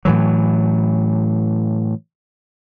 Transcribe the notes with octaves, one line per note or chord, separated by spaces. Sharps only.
A2 E3 F#3